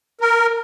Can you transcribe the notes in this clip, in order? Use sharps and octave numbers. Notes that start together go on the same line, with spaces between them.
A#4